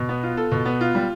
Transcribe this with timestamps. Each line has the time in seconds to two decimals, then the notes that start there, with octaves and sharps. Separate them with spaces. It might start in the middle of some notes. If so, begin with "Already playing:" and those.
Already playing: B2
0.09 B3
0.23 F4
0.37 A4
0.52 B2
0.66 B3
0.81 F4
0.95 G3